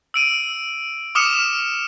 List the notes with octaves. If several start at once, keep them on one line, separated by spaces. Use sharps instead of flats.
E6 D7 D#7
D6 D#6 F6 C#7 E7